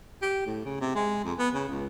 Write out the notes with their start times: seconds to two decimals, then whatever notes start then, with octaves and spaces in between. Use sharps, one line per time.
0.22 G4
0.46 A2
0.65 C#3
0.80 C3
0.95 G#3
1.25 F2
1.38 B3
1.54 C#3
1.68 C#2